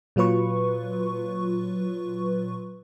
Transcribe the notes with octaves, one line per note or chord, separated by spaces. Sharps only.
A#2 F#3 F4 B4 C#6